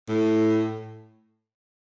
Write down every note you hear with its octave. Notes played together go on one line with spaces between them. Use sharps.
A2